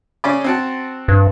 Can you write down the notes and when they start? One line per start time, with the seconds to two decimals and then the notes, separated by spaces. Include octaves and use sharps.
0.24 C#3 C#4 D5
0.44 C4 F#4 A5
1.08 G2